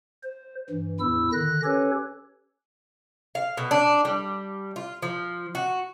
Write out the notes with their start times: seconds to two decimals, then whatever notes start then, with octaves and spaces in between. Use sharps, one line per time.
0.23 C5
0.70 G2 E3
1.00 E2 A2 E4 E6
1.33 D3 D#3 F#6 A#6
1.64 C#4 G4 A4 B4 C#5
3.35 F5
3.57 B2
3.71 D4
4.05 G3
4.76 F4
5.02 F3
5.55 F#4